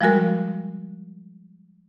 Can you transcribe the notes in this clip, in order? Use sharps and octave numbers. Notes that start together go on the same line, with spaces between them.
F3 G3 G#3 F#4 A#4